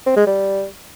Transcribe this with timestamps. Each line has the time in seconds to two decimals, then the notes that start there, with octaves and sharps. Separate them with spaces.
0.06 C4
0.16 G#3
0.26 G3